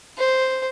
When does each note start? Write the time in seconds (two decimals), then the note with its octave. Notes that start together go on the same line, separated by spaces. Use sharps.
0.18 C5